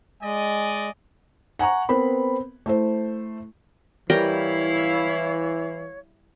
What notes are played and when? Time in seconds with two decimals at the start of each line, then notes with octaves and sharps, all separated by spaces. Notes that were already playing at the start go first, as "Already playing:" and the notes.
0.22 G#3 D5 D#5 G#5
1.59 F#5 G#5 A#5 C#6
1.89 B3 C4 A#4 B5
2.66 A3 E4 C5
4.10 E3 G3 E4 A#4 C#5 F5 G5